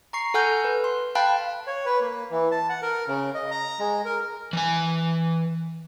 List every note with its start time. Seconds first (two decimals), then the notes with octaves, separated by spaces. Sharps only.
0.13 A#5 C#6 C7
0.34 A4 F#5 G#5 F6 G6
0.64 B4
0.84 C6
1.15 F5 G5 A5 B5 F#6
1.67 C#5
1.86 B4
2.01 A#3
2.31 E3
2.52 A5
2.69 F#5
2.82 A#4
3.08 C#3
3.35 D#5
3.51 A#5
3.79 G#3
4.05 A#4
4.53 E3 G#5